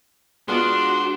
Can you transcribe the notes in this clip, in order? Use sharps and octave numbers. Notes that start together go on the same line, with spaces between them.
G#3 B3 D4 F4 F#4 C6